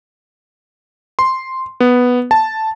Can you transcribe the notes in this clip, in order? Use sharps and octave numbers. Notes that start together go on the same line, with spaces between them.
C6
B3
A5